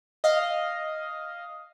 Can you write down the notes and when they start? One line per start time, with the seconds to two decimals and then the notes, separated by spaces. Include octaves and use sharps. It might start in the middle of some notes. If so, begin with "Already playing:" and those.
0.24 D#5 F5